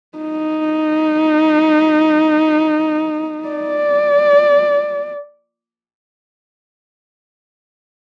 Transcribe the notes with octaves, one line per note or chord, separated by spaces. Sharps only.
D#4
D5